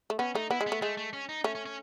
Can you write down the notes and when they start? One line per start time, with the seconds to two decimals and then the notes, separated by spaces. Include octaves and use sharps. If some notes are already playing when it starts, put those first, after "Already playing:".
0.10 A3
0.19 B3 C#4
0.35 A3 D#4
0.51 B3 E4
0.61 G#3
0.67 B3
0.72 A3
0.82 G#3 A3
0.97 A3
1.13 C#4
1.29 D#4
1.44 A3 C#4
1.55 C#4
1.66 C#4